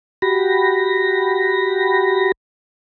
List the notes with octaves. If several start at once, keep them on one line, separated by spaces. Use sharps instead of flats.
F#4 G4 B5 A#6